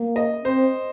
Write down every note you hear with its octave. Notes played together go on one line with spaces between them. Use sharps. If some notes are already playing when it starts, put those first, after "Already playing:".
Already playing: A#3
D#5
C4 C5